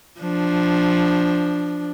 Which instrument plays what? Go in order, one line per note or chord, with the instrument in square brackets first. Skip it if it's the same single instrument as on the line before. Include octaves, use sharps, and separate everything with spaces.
[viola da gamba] F3 D4